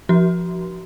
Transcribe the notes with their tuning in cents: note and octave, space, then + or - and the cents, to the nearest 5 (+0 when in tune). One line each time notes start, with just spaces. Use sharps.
F3 -10 F#4 +35